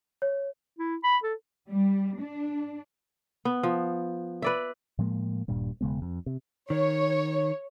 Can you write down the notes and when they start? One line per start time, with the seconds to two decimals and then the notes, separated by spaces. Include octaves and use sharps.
0.22 C#5
0.79 E4
1.04 B5
1.23 A4
1.70 G3
2.21 D4
3.45 B3
3.63 F3
4.42 B4 D5 E5
4.99 A2 F3 G#3 A#3
5.48 D#1 G2 A#2 G3
5.81 E1 C#3 G#3 B3
6.02 F2
6.26 C3
6.70 D#3 C#5